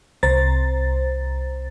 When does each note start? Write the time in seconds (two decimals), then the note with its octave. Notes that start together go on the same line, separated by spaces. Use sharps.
0.23 C2 C5 A#5 A6